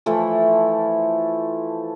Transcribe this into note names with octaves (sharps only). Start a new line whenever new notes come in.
E3 F3 A3 E4